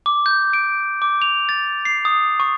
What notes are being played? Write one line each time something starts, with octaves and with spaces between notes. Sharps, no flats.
D6
G6
D7
D6
F7
A6
C7
D#6
C#6